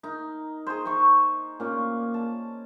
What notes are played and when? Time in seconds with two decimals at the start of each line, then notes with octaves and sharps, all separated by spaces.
0.03 D#4 A#4
0.67 G#4 C5
0.85 C5 A#5 C#6
1.60 A#2 C#4 D5
2.14 A5